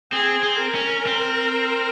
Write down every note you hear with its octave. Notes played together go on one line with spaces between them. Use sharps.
C4 G#4
C4
A#4
C#4
C4